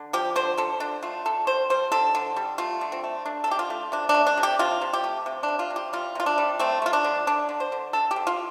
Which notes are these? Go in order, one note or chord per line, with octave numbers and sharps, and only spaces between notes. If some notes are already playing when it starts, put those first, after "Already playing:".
Already playing: D3
F3 G4
D3 C5
D3 A4
D3 D4
A3 F4
D3 A4
G3 C5
G3 C5
D3 A4
D3
G3
A3 F4
D3
C4
A3
A3 D4
A4
D3 G4
F4
A3
C3 D4
D4
A3
D4
C3
G4
C3 F4
C3
G4
A3
C3
D4
G3
F4
C3
G4
G3 F4
C3 F4
D4
G3
A3 C4
A3 F4
D4
D3
D3 D4
D3
C5
D3
D3 A4
G4
D3
F4